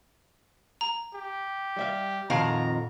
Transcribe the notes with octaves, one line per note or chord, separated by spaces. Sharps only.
A#5
G4
G3 E5 F5
F2 A#2 D#3 F#4 F5 A#5